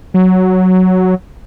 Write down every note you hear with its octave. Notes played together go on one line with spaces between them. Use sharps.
F#3